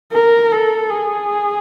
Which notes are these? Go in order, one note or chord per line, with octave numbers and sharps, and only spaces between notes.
A#4
A4
G#4